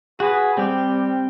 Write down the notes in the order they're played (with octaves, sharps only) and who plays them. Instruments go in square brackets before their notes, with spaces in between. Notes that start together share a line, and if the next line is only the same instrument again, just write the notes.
[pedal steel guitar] F#4 B4 [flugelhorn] G#4
[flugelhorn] G3 [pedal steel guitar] C4 G4